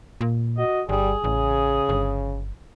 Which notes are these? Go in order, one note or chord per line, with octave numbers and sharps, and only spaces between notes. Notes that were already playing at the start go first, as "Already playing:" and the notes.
A#2
F#4 D#5
G1 G3 G#4
A1 C#3
G1